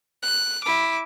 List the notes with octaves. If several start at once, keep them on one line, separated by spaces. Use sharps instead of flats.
F#6
E4 D6